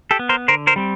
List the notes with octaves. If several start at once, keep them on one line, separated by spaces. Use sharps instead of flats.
G4 A4
B3
A#4 C5
D3 A#4 C5
A#4 C5
G3 C4